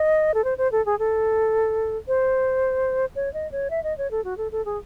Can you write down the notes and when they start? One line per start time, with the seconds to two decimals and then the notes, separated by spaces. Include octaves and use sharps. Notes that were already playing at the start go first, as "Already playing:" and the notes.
Already playing: D#5
0.34 A4
0.44 C5
0.58 C5
0.72 A4
0.86 G#4
0.99 A4
2.08 C5
3.15 C#5
3.33 D#5
3.52 C#5
3.70 E5
3.83 D#5
3.98 C#5
4.11 A4
4.24 F#4
4.37 A4
4.52 A4
4.65 G#4